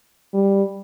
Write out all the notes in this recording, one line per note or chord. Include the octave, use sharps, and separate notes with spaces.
G3